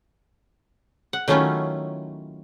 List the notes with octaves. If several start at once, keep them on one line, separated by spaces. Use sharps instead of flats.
F#5
D#3 F#3 A3 C#4 E4 F4